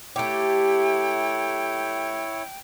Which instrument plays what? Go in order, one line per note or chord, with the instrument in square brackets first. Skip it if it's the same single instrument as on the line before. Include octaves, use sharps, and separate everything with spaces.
[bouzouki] A3 G4 [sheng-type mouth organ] E4 C#5 [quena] G5